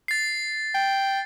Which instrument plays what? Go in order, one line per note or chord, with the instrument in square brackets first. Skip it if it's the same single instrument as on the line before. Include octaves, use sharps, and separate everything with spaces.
[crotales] A6 C7
[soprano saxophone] G5